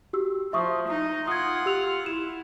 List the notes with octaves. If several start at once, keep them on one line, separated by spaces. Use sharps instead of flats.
F#4 G4 E6
F3 E5 C#6 D#6
D#4
F4 F#5 D#6 G#6
G4 E6 F7
E4 E7